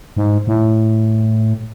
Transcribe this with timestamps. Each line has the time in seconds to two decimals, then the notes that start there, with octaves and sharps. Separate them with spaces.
0.17 G#2
0.47 A2